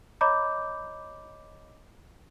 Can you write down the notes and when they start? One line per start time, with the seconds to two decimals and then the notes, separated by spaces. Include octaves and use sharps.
0.21 C#5 D#5 A#5 B5 D6 G6